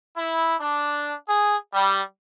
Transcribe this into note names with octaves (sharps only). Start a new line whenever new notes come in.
E4
D4
G#4
G3